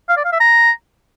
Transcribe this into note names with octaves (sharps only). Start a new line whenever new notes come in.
F5
D5
F5
E5
A#5